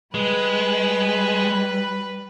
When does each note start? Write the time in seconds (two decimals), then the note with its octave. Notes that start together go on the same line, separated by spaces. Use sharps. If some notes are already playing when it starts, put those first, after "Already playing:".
0.14 G3 G#3 B4